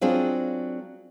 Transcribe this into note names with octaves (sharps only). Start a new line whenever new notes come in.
F#3 C4 D4 F4 G#4